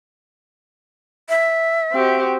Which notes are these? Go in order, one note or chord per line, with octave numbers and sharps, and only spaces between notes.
E5
C4 F#4 G4